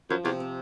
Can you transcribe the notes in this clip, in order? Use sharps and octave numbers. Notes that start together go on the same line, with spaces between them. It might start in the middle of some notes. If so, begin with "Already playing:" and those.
F#2 F3
E2 C3
C4